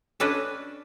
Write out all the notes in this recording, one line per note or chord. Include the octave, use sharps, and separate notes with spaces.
C#4 D4 A4 B4 D5 D#5